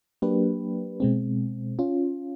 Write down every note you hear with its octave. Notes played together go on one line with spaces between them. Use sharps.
F#3 A#3 D4 G4 B4
B2 G#3 C4
C#4 F4